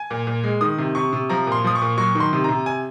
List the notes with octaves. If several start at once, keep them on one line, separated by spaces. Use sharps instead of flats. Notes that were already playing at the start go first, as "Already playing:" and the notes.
Already playing: G#5
A#2
A#2
G#3
D#3 D#6
C3
C3 C#6
C3
F3 A#5
A#2 C6
F3 D#6
C#6
A#2
F#3 C#6
D#3
C6
C3
C3 A#5
G#5